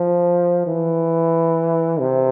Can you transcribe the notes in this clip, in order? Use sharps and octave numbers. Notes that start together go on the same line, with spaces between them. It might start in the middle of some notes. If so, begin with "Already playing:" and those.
Already playing: F3
E3
C3